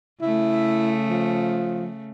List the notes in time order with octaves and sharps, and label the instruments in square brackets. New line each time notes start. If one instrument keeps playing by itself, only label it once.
[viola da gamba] C#3 A3 [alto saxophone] E4
[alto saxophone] F3